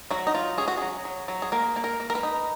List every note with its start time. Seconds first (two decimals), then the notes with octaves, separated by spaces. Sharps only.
0.11 F#3 F#4
0.27 D#4
0.34 F#3 F4
0.58 C#4 G#4
0.68 F#4
0.78 F#3 G#4
1.05 F#3
1.28 F#3
1.42 G#4
1.52 A#3 A#4
1.76 A#3
1.84 A#4
2.00 A#3
2.10 A#4
2.15 B4
2.23 D#4